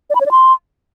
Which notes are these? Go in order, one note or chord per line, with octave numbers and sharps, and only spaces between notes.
D5
B5
C#5
D5
C6